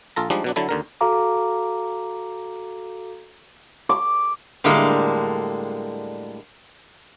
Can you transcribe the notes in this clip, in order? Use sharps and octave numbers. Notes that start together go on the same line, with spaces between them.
A#1 F4 A4 A#5
F3 G3 G#3 D4 D#4
B2 F#3 D4
D3 F#3 E4 A4
D#2 D3 A#4
F#4 A4 F5 A#5 D6
D6
A2 D3 G3 G#3 A#3